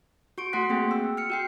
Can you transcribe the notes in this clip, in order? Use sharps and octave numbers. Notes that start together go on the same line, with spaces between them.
F#4 C#6 D7
A3 F#4 F#5 C6 F#6 B6
A#3 C4 G#4 G5
E6
F6 C#7
F#4 G5 C7